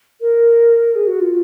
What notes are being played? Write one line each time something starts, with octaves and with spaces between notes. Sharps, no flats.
A#4
G#4
F#4
F4